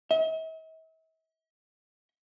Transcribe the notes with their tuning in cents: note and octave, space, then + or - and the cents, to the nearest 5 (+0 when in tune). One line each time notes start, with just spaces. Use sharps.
E5 -45